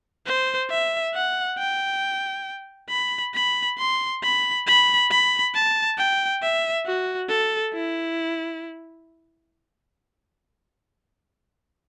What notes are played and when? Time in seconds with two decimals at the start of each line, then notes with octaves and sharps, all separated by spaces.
0.26 C5
0.70 E5
1.14 F#5
1.58 G5
2.90 B5
3.34 B5
3.78 C6
4.23 B5
4.67 B5
5.11 B5
5.55 A5
5.98 G5
6.43 E5
6.86 F#4
7.29 A4
7.73 E4